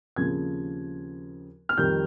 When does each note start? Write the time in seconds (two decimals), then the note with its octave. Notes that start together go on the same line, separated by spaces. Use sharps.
0.16 D#2 C#3 F3 C4 G#6
1.69 F6
1.78 F2 D#3 G3 G6